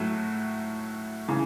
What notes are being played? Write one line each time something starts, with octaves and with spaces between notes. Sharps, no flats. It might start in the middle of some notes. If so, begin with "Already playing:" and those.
Already playing: A2 F#3 A3 F#4
C#3 E3